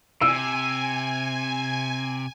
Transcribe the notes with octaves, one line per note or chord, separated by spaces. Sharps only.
C3 G#5 E6